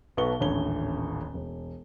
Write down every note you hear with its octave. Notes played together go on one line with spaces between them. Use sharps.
B1 B2 B3 A4 C#6 G7
D#1 A1 D3 C#5 G7
E1